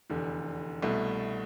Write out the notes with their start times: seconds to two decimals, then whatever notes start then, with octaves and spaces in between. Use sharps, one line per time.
0.10 F1 E2 D3
0.82 C2 B2 A3